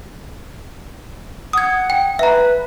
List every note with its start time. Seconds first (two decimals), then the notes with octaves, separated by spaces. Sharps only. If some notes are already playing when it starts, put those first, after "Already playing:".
1.53 F#5 D#6 G#6
1.90 G5
2.19 B4 E5 A#5